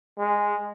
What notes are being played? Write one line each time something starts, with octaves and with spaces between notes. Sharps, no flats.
G#3